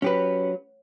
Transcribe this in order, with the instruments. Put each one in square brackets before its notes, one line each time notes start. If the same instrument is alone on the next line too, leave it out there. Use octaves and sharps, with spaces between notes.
[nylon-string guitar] F#3 [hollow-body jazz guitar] C#4 G4 B4